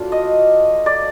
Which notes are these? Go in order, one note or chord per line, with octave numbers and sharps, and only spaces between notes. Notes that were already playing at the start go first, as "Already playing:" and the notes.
Already playing: F#3 A3 D4 F4
D#5
D5